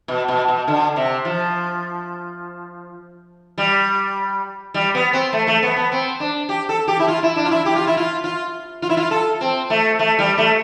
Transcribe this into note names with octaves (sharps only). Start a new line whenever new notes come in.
B2
B2
B2
D3
C3
F3
G3
G3
B3
C4
A3
A3
B3
B3
C4
D4
G4
A4
G4
E4
F4
E4
D4
F4
E4
G4
F4
E4
F4
F4
F4
E4
F4
A4
C4
A3
A3
G3
A3